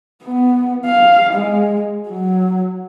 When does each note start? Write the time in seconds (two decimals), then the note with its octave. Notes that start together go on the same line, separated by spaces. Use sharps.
0.24 B3
0.85 F5
1.33 G#3
2.08 F#3